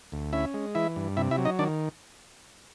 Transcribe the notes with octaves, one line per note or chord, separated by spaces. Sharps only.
D2
C#4 E4 E5
G#3
E3 E4 E5
G2
C3 E4 E5
E4 E5
F#3
D#4 D#5
D#3 D4 D5